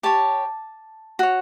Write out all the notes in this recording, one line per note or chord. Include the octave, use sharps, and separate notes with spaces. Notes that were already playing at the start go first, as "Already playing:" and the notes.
G4 C#5 A5
F#4 C#5